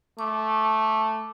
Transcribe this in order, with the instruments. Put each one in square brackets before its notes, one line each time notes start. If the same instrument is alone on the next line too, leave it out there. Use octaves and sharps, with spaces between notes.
[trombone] A3 [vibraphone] D6